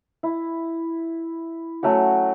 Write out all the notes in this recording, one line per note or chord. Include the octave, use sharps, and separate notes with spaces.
E4
F#3 A3 C#4 F#4